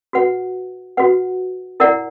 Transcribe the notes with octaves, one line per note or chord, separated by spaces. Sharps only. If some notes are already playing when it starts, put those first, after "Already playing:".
F#4 B4 F#5
F#4 B4 F#5
E4 A#4 D5 F#5